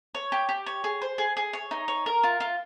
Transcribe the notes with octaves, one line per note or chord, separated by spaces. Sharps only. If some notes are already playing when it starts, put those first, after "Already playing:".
C#5
G4
G4
C#5
G#4
C5
G#4
G#4
C#5
D#4
C#5
A#4
F4
F4